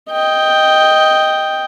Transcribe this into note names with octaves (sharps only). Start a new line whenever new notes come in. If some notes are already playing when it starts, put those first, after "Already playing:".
D#5 G5